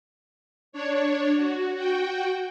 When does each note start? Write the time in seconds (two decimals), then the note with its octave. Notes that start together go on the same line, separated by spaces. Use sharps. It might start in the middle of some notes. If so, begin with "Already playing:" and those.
0.73 D4 C#5
1.36 F#4
1.74 F#4 G5